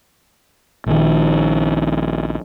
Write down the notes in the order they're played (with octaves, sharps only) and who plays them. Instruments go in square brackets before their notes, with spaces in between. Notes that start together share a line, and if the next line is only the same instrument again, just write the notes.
[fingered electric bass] A#1 D#3